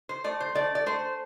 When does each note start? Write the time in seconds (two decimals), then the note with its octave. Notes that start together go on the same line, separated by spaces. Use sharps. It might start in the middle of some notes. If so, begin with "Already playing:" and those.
0.09 C5
0.24 A3 D5
0.40 C5
0.55 A3 D5
0.75 D5
0.86 A3 C5